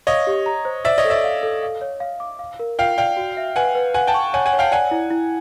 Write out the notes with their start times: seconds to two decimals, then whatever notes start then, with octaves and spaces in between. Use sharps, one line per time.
0.07 C#5 D#5 F5
0.27 G4
0.46 A#5
0.65 C5
0.85 C5 D5 E5
0.98 C#5 D#5
1.05 A4
1.10 D5 E5
1.24 F5
1.43 A4
1.63 F5
1.81 C#5
2.00 F5
2.20 D6
2.39 F5
2.59 A#4
2.79 F4 F5 G5
2.98 D5 F5 G5
3.17 F#4
3.37 E5
3.56 B4 F#5 G#5
3.75 B4
3.94 F5 F#5 G#5
4.07 G5 A5
4.14 C#6
4.33 C#5 F#5 G#5
4.46 F#5 G#5
4.53 C#5
4.59 F5 G5
4.72 D5 F#5 G#5
4.91 E4
5.10 E4